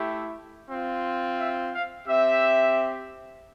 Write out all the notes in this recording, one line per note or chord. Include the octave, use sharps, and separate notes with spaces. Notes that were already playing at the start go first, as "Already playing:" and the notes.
Already playing: A3 E4 G4
C4 F4
E5
F5
C4 G4 E5